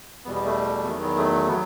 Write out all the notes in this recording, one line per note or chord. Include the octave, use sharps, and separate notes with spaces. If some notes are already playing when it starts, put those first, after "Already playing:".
E2 B2 G3 B3
B3
A3
E2 D#3 F#3 B3
B3
A3
F#3 B3